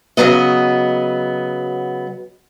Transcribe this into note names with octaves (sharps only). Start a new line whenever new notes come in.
C#3 E3 F#3 B3 D#5